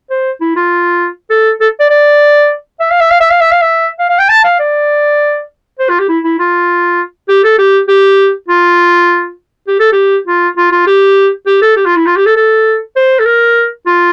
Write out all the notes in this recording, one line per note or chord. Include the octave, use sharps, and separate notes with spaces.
C5
E4
F4
A4
A4
D5
D5
E5
F5
E5
F5
E5
F5
E5
F5
E5
F5
F5
G5
A5
F5
D5
C5
F4
G4
E4
E4
F4
G4
A4
G4
G4
F4
G4
A4
G4
F4
F4
F4
G4
G4
A4
G4
F4
E4
F4
G4
A4
A4
C5
A4
A#4
F4